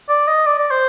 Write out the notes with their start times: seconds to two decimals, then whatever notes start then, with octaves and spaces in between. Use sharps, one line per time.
0.09 D5
0.27 D#5
0.46 D5
0.58 D5
0.71 C5